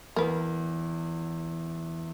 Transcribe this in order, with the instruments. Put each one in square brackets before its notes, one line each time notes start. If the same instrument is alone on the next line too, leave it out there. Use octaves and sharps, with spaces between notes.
[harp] E2 [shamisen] A#4 B4